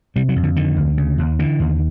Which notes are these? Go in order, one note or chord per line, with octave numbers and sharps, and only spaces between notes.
C3 G3
F#3
F2
D3
D3 D#3
D2
C#3
D#2
D3 E3
D#2